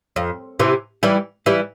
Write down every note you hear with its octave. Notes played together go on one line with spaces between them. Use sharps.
F2
C3 E3
E3 G3
E3 G3